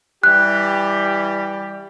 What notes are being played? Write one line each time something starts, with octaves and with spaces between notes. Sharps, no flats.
E3 G3 G4 F#6